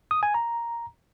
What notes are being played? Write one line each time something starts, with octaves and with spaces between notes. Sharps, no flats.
D#6
G#5
A#5